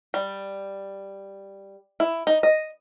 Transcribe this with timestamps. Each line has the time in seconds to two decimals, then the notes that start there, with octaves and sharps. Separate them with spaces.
0.14 G3
2.00 E4
2.27 D#4
2.43 D#5